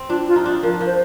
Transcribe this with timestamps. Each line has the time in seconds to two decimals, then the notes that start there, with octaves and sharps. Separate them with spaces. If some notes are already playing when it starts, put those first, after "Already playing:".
Already playing: C4
0.09 D4 F4
0.28 F4
0.36 D#4
0.45 D4
0.63 F3 A#4
0.81 F3
0.86 C5